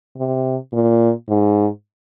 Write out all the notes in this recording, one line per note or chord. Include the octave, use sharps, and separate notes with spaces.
C3
A#2
G#2